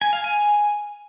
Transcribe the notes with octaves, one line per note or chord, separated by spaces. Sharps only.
G#5
F5
G#5